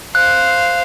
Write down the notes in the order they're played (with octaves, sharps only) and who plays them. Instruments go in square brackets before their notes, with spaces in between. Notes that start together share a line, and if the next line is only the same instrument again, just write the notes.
[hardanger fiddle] C5 F5 [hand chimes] F#6